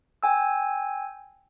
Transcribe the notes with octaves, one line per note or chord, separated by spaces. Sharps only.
G5 G#5 E6